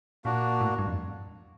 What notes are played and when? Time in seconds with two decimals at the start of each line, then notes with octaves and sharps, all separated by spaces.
0.25 A#2 A#3 D4 F#4
0.61 A2
0.78 G2
0.87 F2